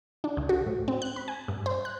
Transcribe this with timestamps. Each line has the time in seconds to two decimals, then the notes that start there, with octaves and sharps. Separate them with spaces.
0.24 D4
0.37 C#2
0.49 F#4
0.66 A2
0.88 C4
1.02 F#6
1.16 B5
1.28 G#5
1.48 G2
1.66 C5
1.85 F#6